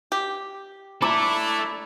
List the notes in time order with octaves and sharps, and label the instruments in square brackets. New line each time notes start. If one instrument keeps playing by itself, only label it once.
[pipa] G4
[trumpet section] D4 E4 [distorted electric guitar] A4 E5 [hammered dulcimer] B5 D6